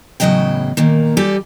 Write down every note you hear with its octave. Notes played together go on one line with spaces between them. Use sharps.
E2 A2 C#3 F#3 D#5 G5
A#2 D#3 A#3
G3 G4 A4 D5 G#5